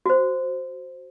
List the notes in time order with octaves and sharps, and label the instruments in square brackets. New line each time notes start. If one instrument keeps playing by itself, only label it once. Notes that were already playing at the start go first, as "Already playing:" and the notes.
[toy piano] F#4 C5